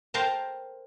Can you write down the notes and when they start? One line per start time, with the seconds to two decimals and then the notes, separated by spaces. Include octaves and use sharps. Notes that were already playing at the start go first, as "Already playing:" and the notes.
0.14 A#4 C5 F5 G5 A5 A#5